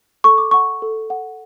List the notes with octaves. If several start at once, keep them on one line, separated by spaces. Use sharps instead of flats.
A4 C#6
D6
F#5 C#6
A4
F#5